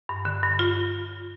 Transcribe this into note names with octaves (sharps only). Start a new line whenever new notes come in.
G2
D3
G2
F4